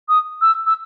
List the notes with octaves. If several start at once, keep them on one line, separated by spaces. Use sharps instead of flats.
D#6
E6
E6